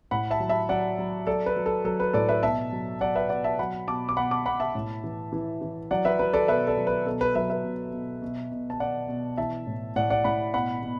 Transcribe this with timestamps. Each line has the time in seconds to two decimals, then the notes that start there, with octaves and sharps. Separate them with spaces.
0.11 A2 F#5 B5
0.30 E5 A5
0.40 F#3
0.49 E5 A5
0.69 F#3 D5 F#5
0.99 F#3
1.27 F#3 A4 D5
1.46 B4
1.56 F#3
1.66 A4
1.85 F#3 A4
2.00 B4
2.13 A2 A4 D5
2.29 B4 E5
2.43 B2 E5 A5
2.72 F#3
3.01 F#3 D5 F#5
3.15 B4 E5
3.29 B2 D5 F#5
3.44 E5 A5
3.59 F#3 F#5 B5
3.88 B2 A5 D6
4.09 D6
4.16 B2 F#5 B5
4.31 A5 D6
4.46 B2 F#5 B5
4.60 E5 A5
4.75 A2
5.04 E3
5.33 E3
5.62 E3
5.91 F#3 D5 F#5
6.05 B4 E5
6.19 F#3 B4
6.33 A4 D5
6.48 B2 B4 E5
6.67 A4 D5
6.77 F#3
6.87 B4
7.06 B2 A4
7.21 B4
7.35 F#3 B4 E5
7.50 B4 E5
7.64 B2
7.93 B2
8.22 B2
8.52 B2
8.70 A5
8.80 B2 D5 F#5
9.09 B2
9.37 E3 E5 A5
9.67 A2
9.96 A2 D5 F#5
10.10 D5 F#5
10.24 A2 F#5 B5
10.54 B2 F#5 B5
10.82 B2